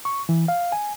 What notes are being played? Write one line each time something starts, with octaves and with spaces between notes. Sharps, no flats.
C#6
E3
F5
G#5